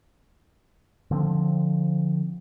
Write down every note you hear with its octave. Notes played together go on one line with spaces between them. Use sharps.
D3 F3 C4